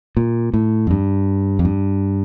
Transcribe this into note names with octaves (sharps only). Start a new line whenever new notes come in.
A#2
A2
F2
G2
F2
G2